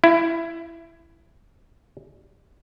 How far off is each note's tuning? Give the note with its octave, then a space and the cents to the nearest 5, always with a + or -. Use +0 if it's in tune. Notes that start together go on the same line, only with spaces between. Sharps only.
E4 +15